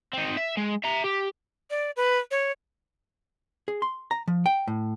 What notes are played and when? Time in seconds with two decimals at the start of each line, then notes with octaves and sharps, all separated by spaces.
0.13 C4 D#4
0.37 E5
0.57 G#3
0.84 E5 A#5
1.04 G4
1.70 D5
1.96 B4
2.31 C#5
3.68 G#4
3.82 C6
4.11 A#5
4.28 F3
4.46 G5
4.68 A2